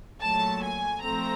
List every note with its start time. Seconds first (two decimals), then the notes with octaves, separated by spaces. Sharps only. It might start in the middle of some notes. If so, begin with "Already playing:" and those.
0.22 A#2 F#3 A3 A5
0.62 G#5
1.01 F3 A3 C4 A#5